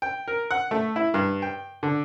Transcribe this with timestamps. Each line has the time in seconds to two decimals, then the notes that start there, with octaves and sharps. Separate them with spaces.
0.02 G5
0.28 A#4
0.51 F#5
0.71 A3
0.96 E4
1.14 G2
1.42 G5
1.83 D3